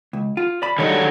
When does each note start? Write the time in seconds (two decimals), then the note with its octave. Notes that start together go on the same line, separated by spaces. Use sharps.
0.13 C#2
0.37 F4
0.62 D5 B5
0.78 D3 D#3 F#3 G3 D#4 C#5